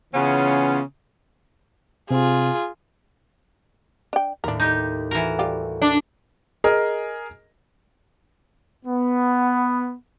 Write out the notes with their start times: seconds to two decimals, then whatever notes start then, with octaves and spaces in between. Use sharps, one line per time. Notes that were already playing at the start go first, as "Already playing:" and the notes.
0.14 C#3 E3 B3 C#4 F4
2.11 C3 C4 F4 G#4
4.13 D4 G5
4.44 D#2 A2 D4 A#4
4.60 D#4 G4
5.11 E3 F#4 A4 A#4
5.39 G3 F4 G4
5.82 D4
6.64 G#4 A#4 D#5
8.85 B3